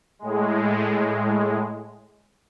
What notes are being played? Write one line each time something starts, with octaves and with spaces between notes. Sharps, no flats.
A2 G#3